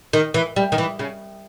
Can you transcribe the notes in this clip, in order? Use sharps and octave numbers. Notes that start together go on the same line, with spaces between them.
D#3
E3
G3
D#3
E3
C#3